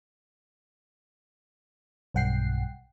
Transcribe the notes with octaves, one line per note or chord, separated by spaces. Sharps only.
B1 G2 F#5 G5 C7